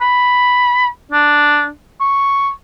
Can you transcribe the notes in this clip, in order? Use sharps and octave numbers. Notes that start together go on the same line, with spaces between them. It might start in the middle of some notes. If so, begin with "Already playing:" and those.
B5
D4
C#6